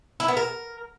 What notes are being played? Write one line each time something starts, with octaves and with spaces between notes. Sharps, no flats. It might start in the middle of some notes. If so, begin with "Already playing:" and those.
E4
B3
A#4